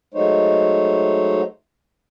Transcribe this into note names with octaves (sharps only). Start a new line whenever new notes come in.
F#3 G#3 A3 D#4 C5 C#5